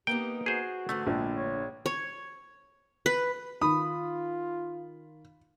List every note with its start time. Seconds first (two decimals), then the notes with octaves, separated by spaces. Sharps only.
0.07 A#3 B3 D#4 G4 G5
0.46 F#4 G#4 C5
0.89 E2 G#2 D3 A3
1.07 A#1 G#3
1.35 C#5
1.86 C#5
3.06 B4
3.61 D#3 F4 B5 D#6